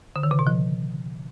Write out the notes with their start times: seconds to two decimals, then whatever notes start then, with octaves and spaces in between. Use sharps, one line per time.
0.16 D3
0.23 D#3
0.31 C#3
0.39 B2
0.47 F3